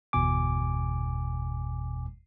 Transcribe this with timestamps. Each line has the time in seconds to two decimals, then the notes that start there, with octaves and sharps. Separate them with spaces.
0.13 G1 E2 B2 G#5 D6